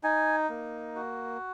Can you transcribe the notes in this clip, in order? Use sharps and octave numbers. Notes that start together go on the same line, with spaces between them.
D#4 G#5
A#3
F#4